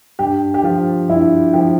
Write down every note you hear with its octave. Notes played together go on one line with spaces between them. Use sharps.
G2 G4
G4
F3 F4
G2 E4
F3 G4